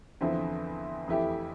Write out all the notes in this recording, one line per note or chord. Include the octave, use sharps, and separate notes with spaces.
E2 D3 F3 C4 E4
F2 E3 A3 E4 G4